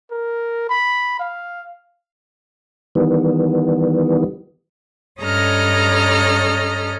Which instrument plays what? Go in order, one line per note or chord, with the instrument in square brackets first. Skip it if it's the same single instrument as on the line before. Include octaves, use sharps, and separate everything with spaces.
[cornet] A#4
B5
F5
[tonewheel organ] D#3 E3 G3 B3
[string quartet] G2 C#4 A4 D#5 A#5 F6